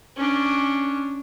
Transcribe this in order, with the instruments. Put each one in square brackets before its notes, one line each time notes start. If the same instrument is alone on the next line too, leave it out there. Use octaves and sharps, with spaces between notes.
[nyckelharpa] C#4 D4